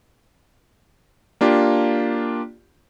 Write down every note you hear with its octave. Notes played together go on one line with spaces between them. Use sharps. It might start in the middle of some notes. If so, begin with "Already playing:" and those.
A#3 D4 F4 G4